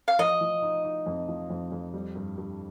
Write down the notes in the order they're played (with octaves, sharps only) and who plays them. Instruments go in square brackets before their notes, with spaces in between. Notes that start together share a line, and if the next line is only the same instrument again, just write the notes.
[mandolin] F5
[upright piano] F3 [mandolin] D#5
[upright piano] F3
D#4
D#4
F2
F3
F2
F2
G3
G2
G2